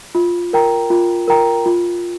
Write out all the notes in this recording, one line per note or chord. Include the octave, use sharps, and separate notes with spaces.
F4
A#4 G5 A#5
F4
A#4 G5 A#5
F4